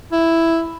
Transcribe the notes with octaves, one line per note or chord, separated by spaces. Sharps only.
E4